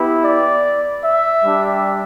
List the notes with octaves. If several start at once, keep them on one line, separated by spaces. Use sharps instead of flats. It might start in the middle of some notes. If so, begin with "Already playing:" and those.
Already playing: B3 E4 G4
D5
E5
G3 D4 G4